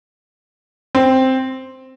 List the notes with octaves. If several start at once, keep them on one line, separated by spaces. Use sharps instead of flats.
C4